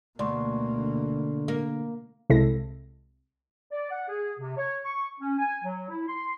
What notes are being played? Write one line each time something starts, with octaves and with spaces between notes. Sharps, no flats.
D2 B2 A#3 D5 C6 C#6
D3
A#3
C2 C3 G#3 E4 A4 A#6
D5
F#5
G#4
C3
C#5
C#6
C#4
G#5
F#3
E4
C6